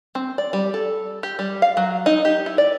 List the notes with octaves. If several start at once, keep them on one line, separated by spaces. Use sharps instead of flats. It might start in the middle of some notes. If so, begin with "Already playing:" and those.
C4
D5
G3
A4
G4
G3
F5
F#3
D#4
G4
E4
D5